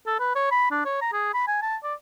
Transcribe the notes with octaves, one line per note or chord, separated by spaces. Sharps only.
A4
B4
C#5
B5
D4
C#5
A#5
G#4
B5
G#5
A5
D5